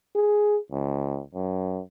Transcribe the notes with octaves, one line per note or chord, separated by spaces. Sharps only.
G#4
C#2
F#2